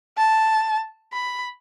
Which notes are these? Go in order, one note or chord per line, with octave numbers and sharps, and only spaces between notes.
A5
B5